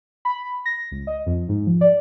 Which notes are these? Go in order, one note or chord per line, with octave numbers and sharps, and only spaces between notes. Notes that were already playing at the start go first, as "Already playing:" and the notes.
B5
A#6
C#2
D#5
F2
G#2
F3
D5